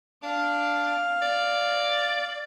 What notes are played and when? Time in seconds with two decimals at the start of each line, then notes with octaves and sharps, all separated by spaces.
0.23 D4 F5
1.22 D5